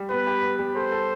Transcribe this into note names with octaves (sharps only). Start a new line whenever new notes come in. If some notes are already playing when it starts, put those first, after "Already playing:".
Already playing: G3
B3 B4
G4
B3
G3
A4 C5
A4